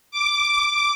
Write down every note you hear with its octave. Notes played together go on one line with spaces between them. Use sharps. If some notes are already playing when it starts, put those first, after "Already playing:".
D6